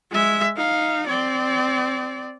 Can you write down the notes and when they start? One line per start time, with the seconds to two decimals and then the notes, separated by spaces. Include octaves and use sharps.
0.11 G#3 E5
0.56 D#4 F5
1.07 C4 D5